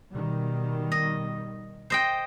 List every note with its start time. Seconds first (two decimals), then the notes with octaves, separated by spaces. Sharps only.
0.13 B2 D#3 G3
0.92 D#5
1.90 C5 D#5 G5